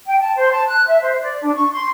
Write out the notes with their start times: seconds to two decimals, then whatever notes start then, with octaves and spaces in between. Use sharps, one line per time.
0.06 G5
0.20 A5
0.37 C5
0.51 A5
0.69 F#6
0.87 E5
1.01 C5
1.21 D5
1.42 D4
1.55 C#6
1.72 C6